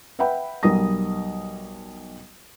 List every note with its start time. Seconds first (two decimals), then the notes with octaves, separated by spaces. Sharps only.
0.19 B4 E5 F#5 G5 B5
0.63 B1 G3 A#4 D#6 A#6